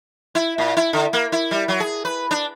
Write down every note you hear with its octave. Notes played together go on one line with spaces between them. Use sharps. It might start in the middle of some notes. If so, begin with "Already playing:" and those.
E4
A#2
E4
D3
A#3
E4
G3
F#3
G#4
B4
D4